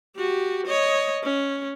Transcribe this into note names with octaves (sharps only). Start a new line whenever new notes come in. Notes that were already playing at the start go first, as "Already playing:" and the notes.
F#4 G4
C#5 D#5
C#4